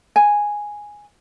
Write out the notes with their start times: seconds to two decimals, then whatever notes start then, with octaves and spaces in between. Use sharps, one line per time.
0.16 G#5